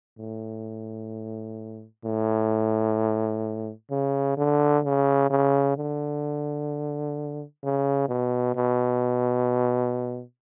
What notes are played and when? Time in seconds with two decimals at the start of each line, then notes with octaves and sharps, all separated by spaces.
0.19 A2
2.05 A2
3.91 C#3
4.37 D3
4.84 C#3
5.30 C#3
5.77 D3
7.63 C#3
8.09 B2
8.55 B2